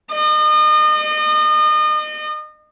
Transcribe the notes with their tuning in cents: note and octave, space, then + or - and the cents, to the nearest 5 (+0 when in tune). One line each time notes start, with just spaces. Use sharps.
D#5 -35 D#6 -35